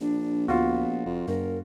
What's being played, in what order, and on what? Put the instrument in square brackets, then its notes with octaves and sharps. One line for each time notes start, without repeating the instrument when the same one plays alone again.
[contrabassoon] A#1 [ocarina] D4
[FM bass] D2 [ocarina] B3 [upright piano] F4 F#4
[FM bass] F1 [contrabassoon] F2
[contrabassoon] F#1 [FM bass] F#2 [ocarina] A#4